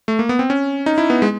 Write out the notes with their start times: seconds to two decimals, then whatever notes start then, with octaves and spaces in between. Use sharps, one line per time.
0.08 A3
0.19 A#3
0.29 B3
0.39 C4
0.50 C#4
0.86 D#4
0.98 E4
1.10 B3
1.22 G#3